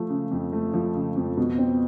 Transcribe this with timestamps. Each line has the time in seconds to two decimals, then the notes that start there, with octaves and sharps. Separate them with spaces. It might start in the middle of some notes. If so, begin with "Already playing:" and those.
Already playing: F3 A3
0.10 C#3
0.31 F2
0.53 A3
0.73 F3
0.95 C#3
1.16 F2
1.37 B2
1.58 C4